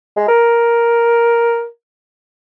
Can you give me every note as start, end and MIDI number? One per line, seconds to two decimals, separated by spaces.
0.17 0.28 56
0.28 1.66 70